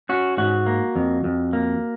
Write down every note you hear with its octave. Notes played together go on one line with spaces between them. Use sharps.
C#4 F#4
G#2 F#4
A#3
F2
F2
A#3